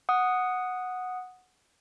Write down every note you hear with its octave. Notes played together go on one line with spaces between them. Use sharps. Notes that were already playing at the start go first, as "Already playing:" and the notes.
F#5 D#6